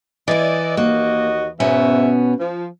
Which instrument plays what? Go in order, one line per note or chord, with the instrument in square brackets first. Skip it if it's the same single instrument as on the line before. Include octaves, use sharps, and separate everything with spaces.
[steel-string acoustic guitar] E3 E4 [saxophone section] D5 D#5
[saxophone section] D#2 F#4 D#5 [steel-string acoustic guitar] A#3
[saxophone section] G#2 E5 [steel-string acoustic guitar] B2 B3 C#4
[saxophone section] F3